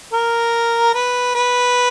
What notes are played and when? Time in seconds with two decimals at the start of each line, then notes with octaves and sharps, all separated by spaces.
0.13 A#4
0.94 B4
1.35 B4